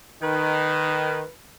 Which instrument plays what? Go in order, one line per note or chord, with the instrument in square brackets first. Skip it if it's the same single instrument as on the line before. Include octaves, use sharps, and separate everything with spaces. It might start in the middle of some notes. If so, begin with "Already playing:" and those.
[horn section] D#3 [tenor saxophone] B4